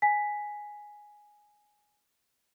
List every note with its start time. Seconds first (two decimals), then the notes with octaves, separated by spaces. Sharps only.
0.02 G#5 B6